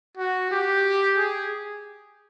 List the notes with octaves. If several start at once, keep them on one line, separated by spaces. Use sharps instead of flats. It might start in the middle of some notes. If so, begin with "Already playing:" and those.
F#4
G4
G#4